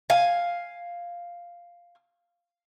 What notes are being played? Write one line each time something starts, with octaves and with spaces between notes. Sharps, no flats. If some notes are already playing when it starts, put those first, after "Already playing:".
F5 G#5